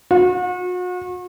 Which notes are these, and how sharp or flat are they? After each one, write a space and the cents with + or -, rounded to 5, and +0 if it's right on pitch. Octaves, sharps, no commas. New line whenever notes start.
F#4 -40